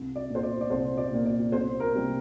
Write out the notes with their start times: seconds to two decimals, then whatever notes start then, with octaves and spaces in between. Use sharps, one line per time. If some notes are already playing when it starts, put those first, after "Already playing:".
Already playing: C2
0.15 D5
0.30 A#2 A#3
0.35 C5
0.43 D5
0.61 D5
0.70 C2 C5
0.98 D5
1.11 A#2 A#3
1.26 D5
1.52 C2 C5
1.80 A#4
1.94 C3 G3 A#3